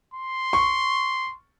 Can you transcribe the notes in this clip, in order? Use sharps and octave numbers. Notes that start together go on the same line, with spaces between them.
C6
C#6